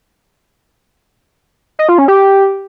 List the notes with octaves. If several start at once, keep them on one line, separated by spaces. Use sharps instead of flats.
D#5
F4
C#4
G4